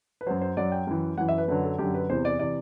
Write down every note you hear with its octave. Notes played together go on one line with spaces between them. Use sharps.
B4
F#2 F#3 C5
C5
F#2 F#3 D5
G5
F#2 E3
F#2 E3 F#5
E5
B4
F#2 D3 F#3 B4
A4
F#2 D3 F#3 G4
B4
E2 C3 E3 C5
D5
C3 E3 D5